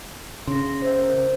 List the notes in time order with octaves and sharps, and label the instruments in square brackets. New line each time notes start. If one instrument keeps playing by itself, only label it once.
[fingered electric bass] C#3 [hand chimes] C6 A#6
[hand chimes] C5 E5
A#4 C5